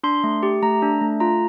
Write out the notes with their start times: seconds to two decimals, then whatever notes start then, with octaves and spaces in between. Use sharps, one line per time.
0.03 D4 C6
0.24 A3
0.43 G4
0.62 A3 A#5
0.82 D4
1.01 A3
1.20 F4 A#5